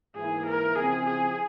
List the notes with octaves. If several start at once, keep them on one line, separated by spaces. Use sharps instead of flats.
G#2 E3 A#3 E4 G#4
A#4
C#3 F3 C4 E4 G#4
G#4